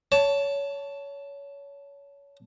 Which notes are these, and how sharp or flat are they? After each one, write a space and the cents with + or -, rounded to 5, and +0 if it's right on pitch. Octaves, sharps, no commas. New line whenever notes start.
C#5 +25 A5 +0